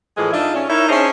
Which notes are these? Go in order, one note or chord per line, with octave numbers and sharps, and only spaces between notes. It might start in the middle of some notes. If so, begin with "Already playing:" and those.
A2 E3 F3 G#3 G#4
D4 D#4 F4 E5
C#4
D#4 E4 A#4 C#5 E5
C#4 D4 G#4 C5 C#5 D#5